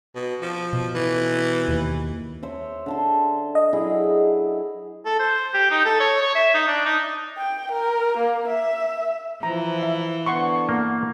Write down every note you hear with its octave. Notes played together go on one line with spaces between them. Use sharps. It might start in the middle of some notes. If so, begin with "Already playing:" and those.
B2
F3
B2
E3
D#2
C5 C#5 E5
D3 A5 C6
D#5
F#3 E4 G#4
A4
C5
G4
D#4
A4
C#5
C#5
E5
D#4
D4
D#4
G5
A#4
A#3
E5
E3 F3 A#5
E5
D3 B3 F#5 C6 C#6
A#3